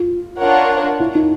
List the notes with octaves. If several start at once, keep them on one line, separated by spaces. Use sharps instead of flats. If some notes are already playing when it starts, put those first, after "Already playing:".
Already playing: F4
D4 F4 A#4 C#5 F#5
E4
D#4